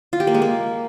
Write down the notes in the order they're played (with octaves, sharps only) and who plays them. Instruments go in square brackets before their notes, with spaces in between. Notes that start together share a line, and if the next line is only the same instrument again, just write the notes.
[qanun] F4
G4
A#3
G#3
A#3